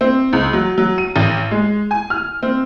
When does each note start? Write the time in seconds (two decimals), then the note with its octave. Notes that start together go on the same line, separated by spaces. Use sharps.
0.01 C4
0.33 C#2
0.53 F#3
0.78 F#3
0.98 D#7
1.16 A1
1.51 G#3
1.91 G#5
2.10 F6
2.43 C4